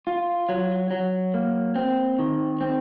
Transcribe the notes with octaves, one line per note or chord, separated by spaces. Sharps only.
F4
F#3
F#3
A#3
C4
D#3
C4